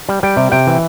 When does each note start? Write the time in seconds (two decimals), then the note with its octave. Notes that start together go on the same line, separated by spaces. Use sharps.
0.09 G3
0.23 G3 G5
0.37 C3
0.52 C3 G5
0.67 E3